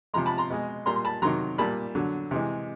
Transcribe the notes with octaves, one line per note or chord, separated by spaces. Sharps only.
C3 F3 G#3 A#5 C6
A5 B5
A#5 C6
B2 G#3
A#2 G3 A#5 C6
C6
A5 B5
C3 D#3 F#3 A#5 C6
A#2 G3 A5 B5
D3 F#3
C3 E3 G#3